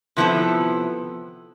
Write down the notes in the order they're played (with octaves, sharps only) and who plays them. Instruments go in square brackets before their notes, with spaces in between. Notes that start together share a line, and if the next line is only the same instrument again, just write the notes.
[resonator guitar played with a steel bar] C3 F3 B3 E4 A4